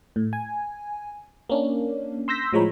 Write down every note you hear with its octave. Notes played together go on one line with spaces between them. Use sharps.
A2
G#5
A#3 C#4 D4
C6 E6 G6 A#6 B6
A2 F3 G#3 C#5 A#5 B5